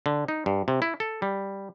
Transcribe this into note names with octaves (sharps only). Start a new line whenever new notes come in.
D3
D#4
G2
C3
E4
A4
G3